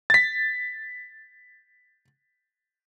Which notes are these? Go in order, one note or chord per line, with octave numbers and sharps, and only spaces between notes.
A6 B6